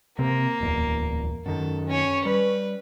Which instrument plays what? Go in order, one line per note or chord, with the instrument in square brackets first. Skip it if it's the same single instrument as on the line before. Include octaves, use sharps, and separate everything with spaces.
[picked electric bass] C3 C4 [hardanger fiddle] A#3
[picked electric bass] D1 E2
[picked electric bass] F#2 D#3 [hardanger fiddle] A4
[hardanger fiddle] C#4 C#5
[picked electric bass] G3 [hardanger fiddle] B4